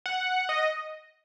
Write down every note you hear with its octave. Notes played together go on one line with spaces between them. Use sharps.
F#5
D#5